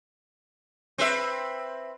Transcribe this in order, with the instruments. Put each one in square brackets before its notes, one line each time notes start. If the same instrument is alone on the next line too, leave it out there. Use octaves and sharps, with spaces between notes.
[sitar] C4 B4 E5